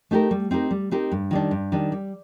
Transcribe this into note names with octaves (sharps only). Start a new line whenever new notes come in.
A3 D#4 G4 A#4
G3
C4 D#4 G4 A#4
G3
C4 D#4 G4 A#4
G2
D#3 G3 D4
G2
D#3 G3 D4
G3